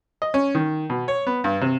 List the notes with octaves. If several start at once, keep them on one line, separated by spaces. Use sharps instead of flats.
D#5
C#4
D#3
B2
C#5
B3
G2
C3